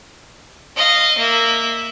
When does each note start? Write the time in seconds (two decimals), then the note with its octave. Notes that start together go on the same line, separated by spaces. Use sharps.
0.76 D#5 F5
1.18 A#3 E5